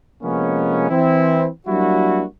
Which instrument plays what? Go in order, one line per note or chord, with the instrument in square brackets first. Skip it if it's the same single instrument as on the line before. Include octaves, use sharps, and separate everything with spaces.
[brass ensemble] C3 F3 G#3 A#3 B3 C#4
E3 C4 E4
F#3 G3 A#3 D4 E4 F#4